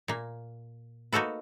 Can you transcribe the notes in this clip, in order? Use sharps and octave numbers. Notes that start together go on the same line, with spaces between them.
A#2 A#3
A#3 D#4 F#4 A4 B4